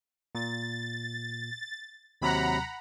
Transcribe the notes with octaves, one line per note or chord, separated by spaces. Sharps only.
A#2 A6
D#2 C3 F#3 F#5 A#5 B5